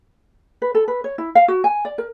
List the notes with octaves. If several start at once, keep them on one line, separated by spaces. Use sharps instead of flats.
B4
A4
B4
C#5
E4
F5
F#4
G#5
D5
A#4